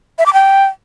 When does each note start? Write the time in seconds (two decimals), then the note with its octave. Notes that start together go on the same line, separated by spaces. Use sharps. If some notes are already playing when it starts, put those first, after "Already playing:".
0.18 E5
0.26 D6
0.33 G5